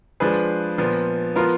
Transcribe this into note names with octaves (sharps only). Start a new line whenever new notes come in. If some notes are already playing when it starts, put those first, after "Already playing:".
F3 G#3 D4 G#4 B4
A#2 F3 B3
F3 B3 F4 A#4